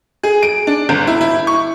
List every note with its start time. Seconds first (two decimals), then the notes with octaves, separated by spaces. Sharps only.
0.23 G#4
0.43 D7
0.67 D4
0.89 G1
1.07 E4
1.21 E4
1.47 C#6